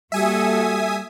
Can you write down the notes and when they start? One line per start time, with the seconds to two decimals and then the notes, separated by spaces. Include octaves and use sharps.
0.12 G3 A#3 F#4 A4 E5 G#5 D#6